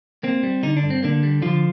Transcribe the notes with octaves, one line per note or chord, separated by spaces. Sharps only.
A#3 C4
G3
D3 D#4
D4
G2
C4
D3 A#3 D4
G3
D3 F3 F4